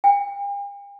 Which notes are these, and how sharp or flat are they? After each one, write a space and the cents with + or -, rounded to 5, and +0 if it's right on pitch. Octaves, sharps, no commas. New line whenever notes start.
G5 +45